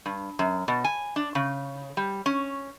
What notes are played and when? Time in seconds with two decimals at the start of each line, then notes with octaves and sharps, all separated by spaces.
0.06 G2
0.39 F#2
0.68 B2
0.84 G#5
1.16 D4
1.35 C#3
1.97 G3
2.26 C#4